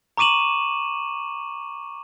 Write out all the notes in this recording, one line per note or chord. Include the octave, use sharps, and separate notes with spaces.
A#5 C#6 D6 D#7 E7 F#7